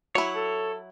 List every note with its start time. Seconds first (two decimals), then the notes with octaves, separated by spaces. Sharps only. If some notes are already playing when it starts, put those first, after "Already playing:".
0.15 F#3 E4 C#5
0.35 A4